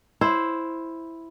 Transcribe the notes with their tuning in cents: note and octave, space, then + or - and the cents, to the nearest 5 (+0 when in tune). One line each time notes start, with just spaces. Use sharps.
E4 +0 C5 +0